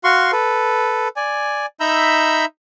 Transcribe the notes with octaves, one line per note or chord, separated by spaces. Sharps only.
F#4 F5 C6 C#6
A4 B4
D5 G#5
D#4 E5 A#5 B5 E6 G6